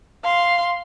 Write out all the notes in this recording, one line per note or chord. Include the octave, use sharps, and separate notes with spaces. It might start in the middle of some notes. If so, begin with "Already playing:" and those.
F5 C6